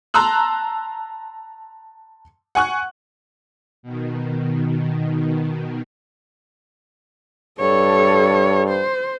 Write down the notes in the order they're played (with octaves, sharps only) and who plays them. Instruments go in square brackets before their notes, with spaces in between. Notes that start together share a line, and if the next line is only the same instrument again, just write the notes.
[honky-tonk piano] A5 A#5 C6 E6 F#6
F#5 G#5 C#6 F#6
[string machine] B2 D#3
[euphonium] G2 [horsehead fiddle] A4 C#5
[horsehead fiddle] C5